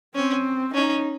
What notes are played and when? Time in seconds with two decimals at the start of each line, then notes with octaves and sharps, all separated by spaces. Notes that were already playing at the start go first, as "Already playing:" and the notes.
0.15 C4 C#4
0.74 C#4 D#4